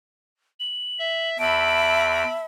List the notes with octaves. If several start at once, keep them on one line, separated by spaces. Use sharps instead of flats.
F#7
E5
E2 E5 A5 B5 D7